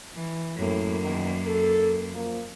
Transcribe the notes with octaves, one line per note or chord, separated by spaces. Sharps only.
E3
F#2 A2 A#3
E2 D#3
A4
F3 A#3